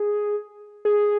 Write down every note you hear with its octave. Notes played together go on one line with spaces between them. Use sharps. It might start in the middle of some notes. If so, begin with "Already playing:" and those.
Already playing: G#4
G#4